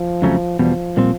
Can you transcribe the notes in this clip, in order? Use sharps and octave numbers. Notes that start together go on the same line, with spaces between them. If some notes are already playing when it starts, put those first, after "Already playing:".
Already playing: F3
F2 C#3 F#3 A3 C#4
E2 B2 F3 G3
A#2 G3 C4